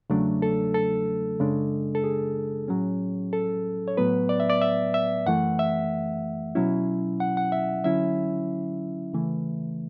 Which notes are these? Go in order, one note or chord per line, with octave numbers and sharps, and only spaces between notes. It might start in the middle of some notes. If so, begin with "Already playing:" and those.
E2 C#3 F#3 A3 D4
A4
A4
F#2 C#3 G#3 D4
A4
G#4
A2 F#3 C#4
A4
C#5
A2 F#3 B3 B4
D5
E5
D5
E5
E5
F#2 E3 A3 F#5
E5
B2 F#3 C#4 E4
F#5
F#5
E5
D3 F#3 C#4 E4 E5
C#3 E3 A3